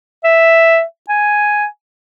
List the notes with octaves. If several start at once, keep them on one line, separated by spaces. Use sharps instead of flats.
E5
G#5